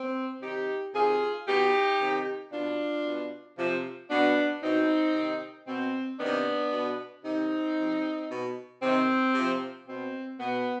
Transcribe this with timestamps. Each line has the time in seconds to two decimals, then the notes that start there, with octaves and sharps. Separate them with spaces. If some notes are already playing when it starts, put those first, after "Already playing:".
Already playing: C4
0.41 C3 D#3 D#4 G4
0.94 C3 D#3 F4 G#4
1.46 B2 D#4 G4
1.99 C3 D#3
2.52 B2 D4 F4
3.05 B2
3.57 C3 F3
4.09 B2 B3 D4
4.62 B2 C4 D#4
5.14 C3 D#3
5.67 B2 C4
6.19 C3 D#3 B3 D4
6.72 B2
7.25 C3 D#3 C4 D#4
7.77 C3 F3
8.30 B2
8.82 C3 D#3 C4
9.34 C3 F3
9.87 B2 C4
10.39 B2 B3